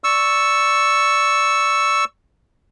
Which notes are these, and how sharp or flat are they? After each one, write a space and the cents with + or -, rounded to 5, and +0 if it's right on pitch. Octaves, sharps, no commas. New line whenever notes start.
D5 +0 C#6 +0 E6 +0